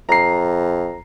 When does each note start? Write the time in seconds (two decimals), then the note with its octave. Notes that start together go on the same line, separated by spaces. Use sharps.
0.09 F2 A#5 C7